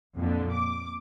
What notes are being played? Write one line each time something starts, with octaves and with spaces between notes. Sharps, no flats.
F2 A#2 D3
D6